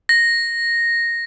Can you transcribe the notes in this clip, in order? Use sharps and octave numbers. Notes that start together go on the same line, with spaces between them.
A#6